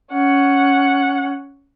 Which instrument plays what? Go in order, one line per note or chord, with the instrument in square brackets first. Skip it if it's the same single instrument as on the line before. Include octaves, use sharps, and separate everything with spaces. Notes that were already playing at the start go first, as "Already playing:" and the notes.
[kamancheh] C#4 F#5